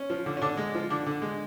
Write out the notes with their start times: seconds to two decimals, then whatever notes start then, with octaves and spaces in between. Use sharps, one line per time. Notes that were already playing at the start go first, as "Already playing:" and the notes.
Already playing: C#4
0.10 F3
0.26 D3
0.37 C#4
0.42 D3 D4
0.57 G#3
0.75 F3
0.90 D3 D4
1.06 D3
1.22 G#3